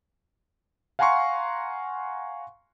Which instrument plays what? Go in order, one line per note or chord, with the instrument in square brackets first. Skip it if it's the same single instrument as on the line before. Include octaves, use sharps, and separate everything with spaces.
[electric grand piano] F5 F#5 G#5 A#5 C6 C#6